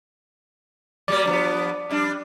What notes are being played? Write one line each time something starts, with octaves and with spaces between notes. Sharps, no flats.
F#3 G3 A#3 D5
G2 F3 B3
F2 G3 D4